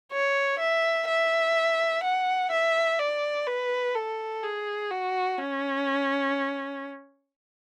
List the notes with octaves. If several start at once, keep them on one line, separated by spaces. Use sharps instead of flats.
C#5
E5
E5
F#5
E5
D5
B4
A4
G#4
F#4
C#4